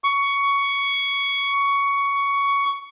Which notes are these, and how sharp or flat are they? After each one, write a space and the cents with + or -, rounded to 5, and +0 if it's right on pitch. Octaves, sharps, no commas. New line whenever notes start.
C#6 +15